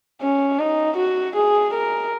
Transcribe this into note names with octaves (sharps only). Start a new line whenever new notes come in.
C#4
D#4
F#4
G#4
A#4